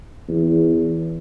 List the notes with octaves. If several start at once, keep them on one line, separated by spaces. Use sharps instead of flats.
E2